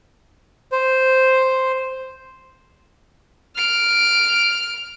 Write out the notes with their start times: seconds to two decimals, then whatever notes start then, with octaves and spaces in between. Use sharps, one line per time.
0.72 C5
3.56 F6 D7